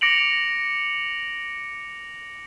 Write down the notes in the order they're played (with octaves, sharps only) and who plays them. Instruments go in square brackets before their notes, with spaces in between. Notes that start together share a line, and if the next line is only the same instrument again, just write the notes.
[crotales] D6 A#6 C#7 D7 F7 F#7